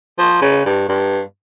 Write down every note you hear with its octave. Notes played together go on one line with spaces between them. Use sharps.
F3
C#3
G2
G2